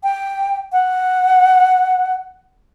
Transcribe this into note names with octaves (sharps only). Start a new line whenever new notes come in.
G5
F#5